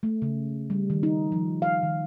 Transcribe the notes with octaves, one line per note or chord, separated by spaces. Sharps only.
A3
C#3
G3
D#3
D#4
F3
F5
D#3